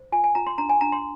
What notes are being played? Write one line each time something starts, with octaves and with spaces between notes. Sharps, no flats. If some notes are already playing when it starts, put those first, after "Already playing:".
Already playing: C5
F4 G#5
G#5
F4 A#5
C6
D4 A#5
G#5
D4 A#5
C6